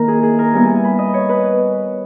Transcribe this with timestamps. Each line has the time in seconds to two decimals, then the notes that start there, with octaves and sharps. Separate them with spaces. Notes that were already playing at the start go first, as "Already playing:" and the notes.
Already playing: D#3 A#3 E4 A#4
0.08 G#4
0.23 G#4
0.39 A#4
0.53 G3 B3 E4 G#5
0.68 G#5
0.84 B5
0.99 D#5
1.14 C#5
1.29 B4